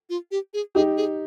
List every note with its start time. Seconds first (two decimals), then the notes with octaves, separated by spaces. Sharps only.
0.10 F4
0.31 G4
0.54 G#4
0.75 D#4 G4 G#4
0.97 G#4